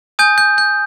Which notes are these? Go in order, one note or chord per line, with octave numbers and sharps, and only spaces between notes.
G#5 D#6 G6
G6
G6